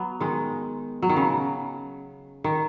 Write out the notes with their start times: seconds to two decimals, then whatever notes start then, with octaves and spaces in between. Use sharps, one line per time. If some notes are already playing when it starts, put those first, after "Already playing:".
Already playing: F#3 B3
0.20 D#3 G#3
1.02 F#3
1.09 D#3
1.16 C#3
2.44 D#3